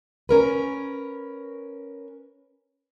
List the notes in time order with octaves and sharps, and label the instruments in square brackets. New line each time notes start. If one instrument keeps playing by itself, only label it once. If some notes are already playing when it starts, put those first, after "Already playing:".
[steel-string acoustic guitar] C#4 A#4 B4